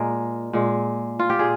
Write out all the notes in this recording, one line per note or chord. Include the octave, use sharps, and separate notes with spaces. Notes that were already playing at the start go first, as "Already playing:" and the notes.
Already playing: A#2 G#3 G#4 A#4
A#2 G#3
F4
G4
A#2 G#4